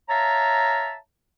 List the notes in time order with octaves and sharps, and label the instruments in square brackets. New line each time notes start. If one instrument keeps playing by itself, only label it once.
[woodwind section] C#5 E5 F5 A5 A#5